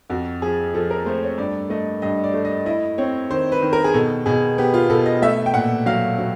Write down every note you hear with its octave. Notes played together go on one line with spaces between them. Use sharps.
F2 F#4
F3 G#4
F3 A4
A#4
A3 C5
C#5
G2 D5
A3 D#5
G2 D#5
D5
A3
D#5
E4 D#5
C4 C#5
D#3 C5
B4
D#3
A#4
G#4
B2 A4
B2 G#4
B3 G4
F4
B2 A4
D#5
A3 E5
G5
A#2 F#5
F#3 F5
F#3